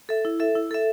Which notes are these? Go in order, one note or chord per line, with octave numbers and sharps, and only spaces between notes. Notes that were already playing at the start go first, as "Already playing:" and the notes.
A4 E5
E4
A4 E5
E4
A4 E5